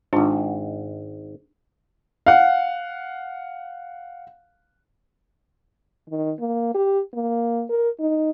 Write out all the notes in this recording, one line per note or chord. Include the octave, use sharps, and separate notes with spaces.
G#1 G#2 D4 F4 A5
F5 F#5
D#3
A#3
G4
A#3
A#4
D#4